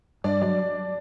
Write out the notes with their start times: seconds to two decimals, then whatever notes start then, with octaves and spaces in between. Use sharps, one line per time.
0.24 G2 D4 D5
0.42 F#3 D4 D5